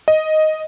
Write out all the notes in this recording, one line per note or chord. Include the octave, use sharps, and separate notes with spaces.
D#5